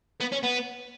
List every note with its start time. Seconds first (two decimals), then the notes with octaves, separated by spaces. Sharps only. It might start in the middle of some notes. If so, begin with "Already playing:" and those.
0.21 B3
0.32 C#4
0.44 B3